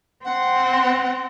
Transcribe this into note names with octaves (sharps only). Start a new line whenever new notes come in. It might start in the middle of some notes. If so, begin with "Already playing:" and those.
C4 F#5